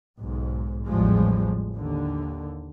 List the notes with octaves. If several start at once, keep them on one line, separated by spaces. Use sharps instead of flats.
B1 G#2
A1 E2 C#3 F3 G3 G#3
D#2 D3